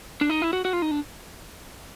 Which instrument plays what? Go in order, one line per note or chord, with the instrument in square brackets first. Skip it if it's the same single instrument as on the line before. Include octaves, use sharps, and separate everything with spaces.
[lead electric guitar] D4
D#4
E4
F#4
F#4
F4
D#4
D4